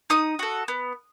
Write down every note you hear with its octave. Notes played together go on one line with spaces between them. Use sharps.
D#4 D#6
F#4 A4
B3